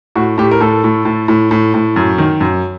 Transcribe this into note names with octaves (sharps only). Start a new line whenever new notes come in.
A2 F#4
A2 G4
A#4
A2 A4
A2
A2
A2
A2
A2
F#2
D#3
F#2